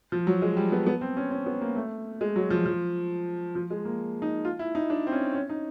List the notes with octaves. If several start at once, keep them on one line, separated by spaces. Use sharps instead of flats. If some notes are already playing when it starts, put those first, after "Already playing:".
F3
F#3
G#3
G3
B3
B3
C4
C#4
C#4
B3
A#3
A3
G#3
F#3
F3
F3
F3
G#3
A#3
D#4
F4
E4
D#4
D4
C4
C#4
C#4
D#4